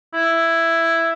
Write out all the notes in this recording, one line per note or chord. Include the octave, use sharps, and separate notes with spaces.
E4